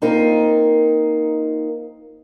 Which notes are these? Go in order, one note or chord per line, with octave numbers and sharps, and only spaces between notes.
A#3 C4 D#4 F4 A#4